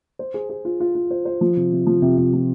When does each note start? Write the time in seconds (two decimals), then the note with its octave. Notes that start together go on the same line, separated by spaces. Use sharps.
0.19 C5
0.34 G#4
0.50 G#4
0.65 F4
0.80 F4
0.95 F4
1.11 C5
1.25 C5
1.41 F3
1.57 C3
1.72 C3
1.87 F3
2.02 C3
2.18 C3
2.33 F3